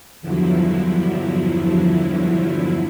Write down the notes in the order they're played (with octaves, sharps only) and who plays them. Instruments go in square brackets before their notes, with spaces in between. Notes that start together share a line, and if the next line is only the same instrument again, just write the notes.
[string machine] E2 G2 D3 F3 F#3 E4